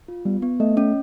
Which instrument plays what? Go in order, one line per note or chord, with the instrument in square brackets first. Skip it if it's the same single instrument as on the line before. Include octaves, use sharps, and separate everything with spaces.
[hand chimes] F4
[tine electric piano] G3 [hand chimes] B3
[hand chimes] B3
[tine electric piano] A3 [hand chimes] D#5
[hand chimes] C#4